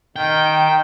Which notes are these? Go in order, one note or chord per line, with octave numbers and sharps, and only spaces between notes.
D#3 G5